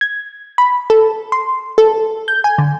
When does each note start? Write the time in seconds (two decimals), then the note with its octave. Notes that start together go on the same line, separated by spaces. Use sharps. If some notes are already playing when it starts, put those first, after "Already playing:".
0.01 G#6
0.58 B5
0.90 A4
1.32 C6
1.78 A4
2.28 G6
2.44 G#5
2.58 D3